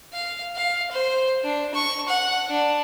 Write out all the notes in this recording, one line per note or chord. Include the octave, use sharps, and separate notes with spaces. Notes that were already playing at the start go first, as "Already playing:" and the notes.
F5
F5
C5
D4
C#6
F#5
D4